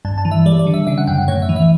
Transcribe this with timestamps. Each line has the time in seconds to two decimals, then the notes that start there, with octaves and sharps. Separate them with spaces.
0.05 G2 A5
0.18 A5
0.25 E3
0.31 E5
0.46 G3 D5
0.59 D5
0.67 D3
0.74 E5
0.87 C#3 E5
0.98 F#5
1.07 F#2 G5
1.18 F#5
1.28 A2 C#5
1.42 E5
1.49 E3
1.56 E5